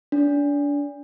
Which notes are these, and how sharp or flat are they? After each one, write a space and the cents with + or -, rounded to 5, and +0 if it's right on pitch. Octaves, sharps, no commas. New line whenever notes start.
D4 -30